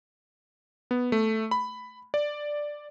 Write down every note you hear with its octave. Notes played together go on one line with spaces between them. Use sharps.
B3
A3
B5
D5